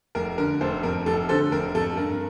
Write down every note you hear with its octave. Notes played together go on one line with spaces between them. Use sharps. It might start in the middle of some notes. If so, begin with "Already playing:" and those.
F1 A#4
D3 A#4
F1 A4 C5
F2 A#4
F1 A4
D3 A4 C5
F1 A#4
F2 A4
G2 A#4